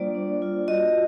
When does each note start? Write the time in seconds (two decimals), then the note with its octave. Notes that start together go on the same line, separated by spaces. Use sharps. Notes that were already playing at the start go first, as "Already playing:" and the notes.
Already playing: G3 A#3 D4 F4 C5 D5
0.15 D4
0.42 F4
0.68 F#4 D#5